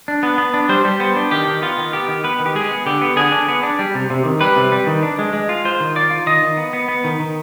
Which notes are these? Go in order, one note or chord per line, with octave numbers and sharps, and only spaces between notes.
D4
B3
B3
D4
G3 C5
G3
B3 C5
D4
D#3 G4
D#3
B3 F4
D#3
B3 G4
D#3
B3 B4
D#3
G4
G#3 G#4
B3
D3 G4
B3
D3 G#4
D4
B3
D4
G3
C3
C3
D#3
G3 B4
C3
G3
D#3
D4
G#3
G#3
F4
F4 C5
D#3
F4 D5
F4
D#3 D#5
D#3
B3
B3
B3
D#3
D#3